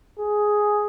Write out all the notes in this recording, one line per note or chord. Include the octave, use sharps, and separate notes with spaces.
G#4